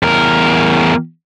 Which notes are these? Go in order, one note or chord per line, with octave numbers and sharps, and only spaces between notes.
E2 A#4